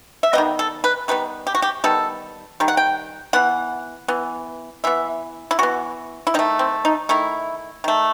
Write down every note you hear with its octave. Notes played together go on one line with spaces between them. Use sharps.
E5
D#3 G3 B3 D#5
A4
B4
D#3 G3 B3 B4
G4
F#4
G4
D#3 G3 B3 A4
D#3 G3
F#5
G5
E3 B3 F#5
E3 B3
E3 B3 E5
E4
E3 B3 F#4
E4
D#3 A3 D#4
C4
D#4
D#3 A3 E4
D#3 A3